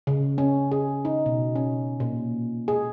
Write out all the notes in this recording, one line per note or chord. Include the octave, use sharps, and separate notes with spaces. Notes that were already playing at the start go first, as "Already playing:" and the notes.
C#3
C#4
G#4
D#4
B2
C#4
A#2
G#4